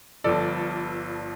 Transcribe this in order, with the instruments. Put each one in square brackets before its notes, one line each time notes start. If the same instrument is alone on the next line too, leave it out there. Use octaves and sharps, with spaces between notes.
[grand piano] G1 G2 F3 A4 D5